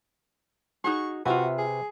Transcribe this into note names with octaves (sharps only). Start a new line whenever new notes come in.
D#4 F#4 G#4 C#6
C3 F4 F#4 B4 E5 G#5
G#4